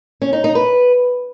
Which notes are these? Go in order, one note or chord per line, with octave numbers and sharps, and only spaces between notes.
C#4
D#4
D#4
B4